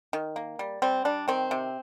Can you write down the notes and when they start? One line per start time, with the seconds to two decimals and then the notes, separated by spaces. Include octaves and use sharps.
0.13 D#3
0.36 A#3
0.59 G3
0.82 G3 C4
1.05 G3 D4
1.28 D#3 C4
1.51 C3